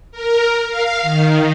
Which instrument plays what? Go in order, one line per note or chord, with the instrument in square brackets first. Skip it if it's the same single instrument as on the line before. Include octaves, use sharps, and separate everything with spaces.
[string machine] A#4
F5
D#3